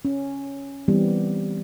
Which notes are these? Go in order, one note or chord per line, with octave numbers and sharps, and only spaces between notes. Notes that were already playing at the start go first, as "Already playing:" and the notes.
C#4
E3 G3 B3 C4